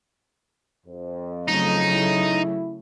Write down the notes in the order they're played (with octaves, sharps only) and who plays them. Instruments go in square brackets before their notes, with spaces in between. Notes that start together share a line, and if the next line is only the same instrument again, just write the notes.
[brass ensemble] F2
[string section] C#3 F#3 A3 [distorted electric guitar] D#4
[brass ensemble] E4